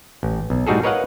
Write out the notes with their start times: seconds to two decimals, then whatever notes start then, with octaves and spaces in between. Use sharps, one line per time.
0.23 A1
0.50 B1
0.67 A2 G3 D#4 F#4 G#4 A4
0.83 A#4 B4 C#5 D#5 F5 F#5